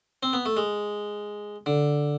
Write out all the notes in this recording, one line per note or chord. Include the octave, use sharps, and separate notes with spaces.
C4
B3
A3
G#3
D3